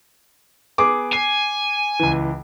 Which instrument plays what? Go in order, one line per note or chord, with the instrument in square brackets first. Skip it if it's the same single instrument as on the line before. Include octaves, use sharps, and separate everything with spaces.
[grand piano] B3 G#4 [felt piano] D6
[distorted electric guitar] G#5 [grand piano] C7
[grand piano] C#2 E3